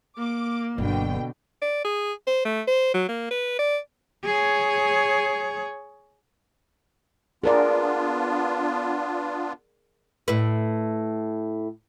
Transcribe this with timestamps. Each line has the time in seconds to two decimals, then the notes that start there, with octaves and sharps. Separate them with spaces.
0.18 A#3 D6
0.78 G1 B2 D3 F#3 G5
1.62 D5
1.84 G#4
2.27 C5
2.45 A3
2.68 C5
2.94 F#3
3.09 A#3
3.31 B4
3.59 D5
4.25 G#4 C#5
7.44 B3 D4 F4 G#4 A#4 D5
10.28 A2 B4